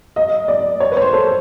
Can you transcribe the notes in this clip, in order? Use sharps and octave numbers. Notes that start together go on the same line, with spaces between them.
D#5
D5
C#5
B4
C#5
C5
A4